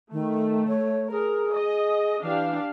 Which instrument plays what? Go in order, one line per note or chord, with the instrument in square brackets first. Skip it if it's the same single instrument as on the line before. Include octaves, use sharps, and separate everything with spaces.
[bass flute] D#3 [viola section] A3
[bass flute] C#5
[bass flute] G#4 [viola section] A#4
[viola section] D#5
[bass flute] E3 [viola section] D4 G4 F5